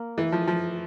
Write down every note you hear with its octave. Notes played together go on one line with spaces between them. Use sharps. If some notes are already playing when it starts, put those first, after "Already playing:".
Already playing: A#3
E3
F3
F3